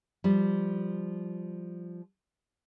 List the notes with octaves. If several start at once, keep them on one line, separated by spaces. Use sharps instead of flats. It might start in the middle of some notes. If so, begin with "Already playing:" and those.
F3 G3